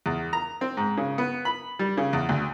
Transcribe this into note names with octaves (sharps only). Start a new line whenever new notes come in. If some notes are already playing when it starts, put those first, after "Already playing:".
E2
A#5
C4
G#2
C#3
B3
B5
G3
C#3
E2
D2